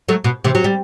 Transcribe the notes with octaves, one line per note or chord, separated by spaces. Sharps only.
F#3 A3
B2
C3 E3
F#3
G3